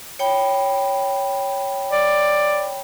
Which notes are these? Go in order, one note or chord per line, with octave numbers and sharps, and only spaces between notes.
C#5 G5 B5
D5